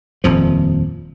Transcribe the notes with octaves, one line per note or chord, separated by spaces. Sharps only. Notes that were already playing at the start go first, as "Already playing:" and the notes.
D#1 F2 F3